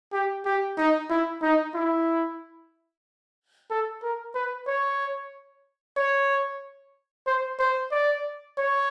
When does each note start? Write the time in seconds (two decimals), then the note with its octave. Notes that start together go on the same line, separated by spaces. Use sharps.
0.13 G4
0.45 G4
0.78 D#4
1.10 E4
1.42 D#4
1.74 E4
3.70 A4
4.02 A#4
4.35 B4
4.67 C#5
5.96 C#5
7.27 C5
7.59 C5
7.91 D5
8.57 C#5